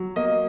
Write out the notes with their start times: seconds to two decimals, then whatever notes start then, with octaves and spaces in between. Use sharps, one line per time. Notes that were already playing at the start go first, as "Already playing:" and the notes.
Already playing: F#3
0.16 A#3 D#5